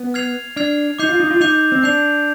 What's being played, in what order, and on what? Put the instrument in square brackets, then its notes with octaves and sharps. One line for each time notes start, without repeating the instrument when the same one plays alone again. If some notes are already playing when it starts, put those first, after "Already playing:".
Already playing: [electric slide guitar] B3
[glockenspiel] F6 G#6 C7 F7
[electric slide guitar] D4 [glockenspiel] F6 G#6 C7 F7
[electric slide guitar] D#4 [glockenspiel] D6 G6 C7 F7
[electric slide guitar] F4
D#4
F4
[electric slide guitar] D#4 [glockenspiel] D6 G6 C7 F7
[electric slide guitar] C4
[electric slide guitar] D4 [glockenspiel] D6 G6 C7 F7